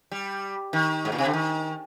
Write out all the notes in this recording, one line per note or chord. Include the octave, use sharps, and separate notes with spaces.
G3
D#3
G#2
A#2
C3
D3
D#3